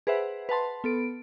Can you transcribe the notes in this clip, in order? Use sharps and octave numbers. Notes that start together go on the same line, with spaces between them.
G#4 B4 C5 E5 F#5
B4 F#5 A5 C6
B3 A4 D7